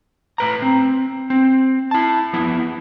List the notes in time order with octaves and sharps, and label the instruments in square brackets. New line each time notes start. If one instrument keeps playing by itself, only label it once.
[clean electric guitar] A2 B4 A#5
C4
C4
E4 A5
F3 B3 E4